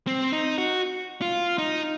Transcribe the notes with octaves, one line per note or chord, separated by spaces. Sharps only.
C4
D#4
F#4
F4
D#4